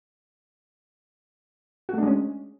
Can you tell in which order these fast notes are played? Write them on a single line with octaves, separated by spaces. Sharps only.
F#4 A3 D4 G#3 C#4